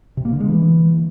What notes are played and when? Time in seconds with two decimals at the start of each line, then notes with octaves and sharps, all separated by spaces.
0.17 C3
0.25 A#3
0.33 D3
0.40 G#3
0.48 E3